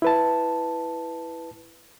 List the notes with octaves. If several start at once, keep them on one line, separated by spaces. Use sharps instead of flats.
E4 B4 A5